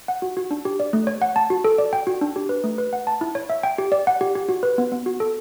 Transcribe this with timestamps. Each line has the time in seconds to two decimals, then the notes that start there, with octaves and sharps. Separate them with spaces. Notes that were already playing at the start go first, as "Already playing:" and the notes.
0.08 F#5
0.22 F#4
0.37 F#4
0.51 D4
0.65 G4
0.80 D5
0.93 A3
1.07 C#5
1.22 F#5
1.36 A5
1.50 F#4
1.64 A4
1.78 D5
1.93 G5
2.07 F#4
2.21 D4
2.36 G4
2.49 B4
2.64 A3
2.78 B4
2.93 F#5
3.07 A5
3.21 E4
3.35 C#5
3.50 E5
3.63 G5
3.78 G4
3.92 D5
4.07 F#5
4.21 G4
4.35 G4
4.49 F#4
4.63 B4
4.78 B3
4.92 B3
5.06 F#4
5.20 A4